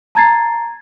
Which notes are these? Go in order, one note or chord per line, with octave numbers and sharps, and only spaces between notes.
A5 A#5 G#6 A6 C7